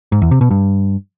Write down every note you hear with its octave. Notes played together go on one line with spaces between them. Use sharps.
G#2
E2
C3
B2
G2